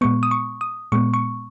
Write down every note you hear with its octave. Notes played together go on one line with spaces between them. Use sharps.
A#2 G#3 B3 C#6
D#6
C#6
D#6
A#2 G#3 B3 C#6
C#6